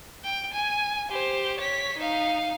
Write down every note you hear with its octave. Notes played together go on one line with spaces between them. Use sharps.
G5
G#5
G4 C5
C#5 B6
D#4 F5